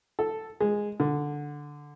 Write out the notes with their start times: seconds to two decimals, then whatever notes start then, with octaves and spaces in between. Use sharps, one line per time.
0.19 A4
0.60 G#3
1.00 D3